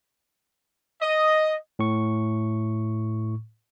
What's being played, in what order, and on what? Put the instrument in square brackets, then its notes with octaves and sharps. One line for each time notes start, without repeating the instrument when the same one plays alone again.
[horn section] D#5
[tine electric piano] A2 C#6